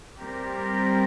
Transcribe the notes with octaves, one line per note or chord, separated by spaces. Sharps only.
G3 C4 G4 A#4